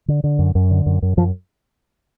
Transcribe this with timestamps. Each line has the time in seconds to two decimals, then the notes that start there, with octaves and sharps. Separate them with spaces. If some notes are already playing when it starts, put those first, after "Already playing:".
0.08 D3
0.24 D3
0.39 F#2
0.55 F#2
0.71 D3
0.86 F#2
1.02 F#2
1.17 F#2 F3